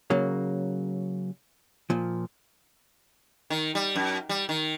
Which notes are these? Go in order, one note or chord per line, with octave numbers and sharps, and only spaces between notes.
C#3 F#3 A#3
A#2 F3
D#3
G3
F#2
G3
D#3